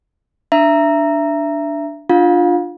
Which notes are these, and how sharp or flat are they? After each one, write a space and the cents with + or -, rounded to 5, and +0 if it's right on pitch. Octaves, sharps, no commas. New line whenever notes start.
D4 +0 E5 +20 A#5 +0
D4 +15 F4 +0 F5 +35